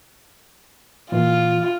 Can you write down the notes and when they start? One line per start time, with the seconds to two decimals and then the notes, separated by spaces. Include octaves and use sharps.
1.12 A#2 E3 F4